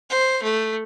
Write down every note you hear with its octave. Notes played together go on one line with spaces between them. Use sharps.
C5
A3